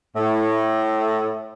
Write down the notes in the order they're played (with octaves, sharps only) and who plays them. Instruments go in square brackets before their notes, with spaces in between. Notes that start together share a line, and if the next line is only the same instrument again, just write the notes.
[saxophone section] A2